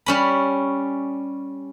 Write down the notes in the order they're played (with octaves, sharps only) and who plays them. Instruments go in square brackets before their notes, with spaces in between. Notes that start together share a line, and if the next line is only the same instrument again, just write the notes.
[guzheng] G3 C#4 B5